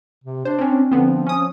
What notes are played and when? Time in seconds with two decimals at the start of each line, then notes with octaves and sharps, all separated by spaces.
0.24 C3
0.45 D4 C5
0.59 C4 C#4
0.92 D3 F3 B3 C4
1.27 C#4 D#6